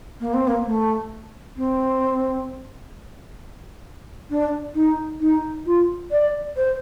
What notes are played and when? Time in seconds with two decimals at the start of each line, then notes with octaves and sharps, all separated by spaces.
0.20 A#3
0.33 C4
0.47 A#3
0.65 A3
1.56 C4
4.30 D4
4.74 D#4
5.20 D#4
5.65 F4
6.11 D5
6.57 C5